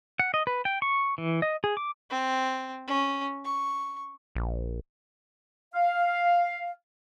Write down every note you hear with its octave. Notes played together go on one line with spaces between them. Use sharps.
F#5
D#5
B4
G5
C#6
E3
D#5
G#4
D6
C4
C#4
C#6
A#1
F5